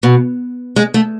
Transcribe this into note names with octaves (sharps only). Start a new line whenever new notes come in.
B2
G#3
A3